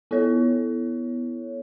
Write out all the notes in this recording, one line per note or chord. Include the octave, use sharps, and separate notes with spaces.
B3 E4 A4 C#5